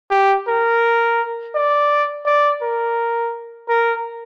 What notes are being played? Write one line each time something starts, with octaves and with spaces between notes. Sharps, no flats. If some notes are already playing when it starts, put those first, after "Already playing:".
G4
A#4
D5
D5
A#4
A#4